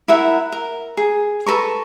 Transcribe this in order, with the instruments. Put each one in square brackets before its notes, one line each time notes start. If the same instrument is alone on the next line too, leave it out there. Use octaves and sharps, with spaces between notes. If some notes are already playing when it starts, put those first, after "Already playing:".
[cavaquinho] E4 A#4 E5 F#5
A#4
G#4
A4 B4 A#5 C#6